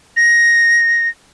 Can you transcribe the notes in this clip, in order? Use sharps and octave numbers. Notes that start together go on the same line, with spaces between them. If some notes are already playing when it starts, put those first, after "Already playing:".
A#6